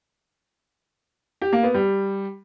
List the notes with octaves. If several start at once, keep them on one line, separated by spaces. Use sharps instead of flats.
G4
A#3
B3
G3